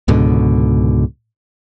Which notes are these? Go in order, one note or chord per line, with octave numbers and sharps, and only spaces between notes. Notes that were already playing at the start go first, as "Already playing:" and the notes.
C#2 G#2 B2 D3